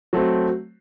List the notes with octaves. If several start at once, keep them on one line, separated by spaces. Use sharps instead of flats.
F#3 A3 C4